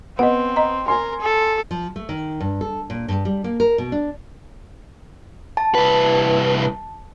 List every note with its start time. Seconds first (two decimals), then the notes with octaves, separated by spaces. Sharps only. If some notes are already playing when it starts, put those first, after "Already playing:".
0.19 B3 C4 D#5 F#5
0.56 D#5 A#5
0.88 A#4 G#5 C6
1.21 A4
1.71 F3
1.96 A3
2.09 D#3
2.40 G2
2.61 A4
2.90 A#2
3.08 G2
3.25 G3
3.44 A#3
3.60 A#4
3.78 B2
3.92 D4
5.57 A5
5.75 C2 B4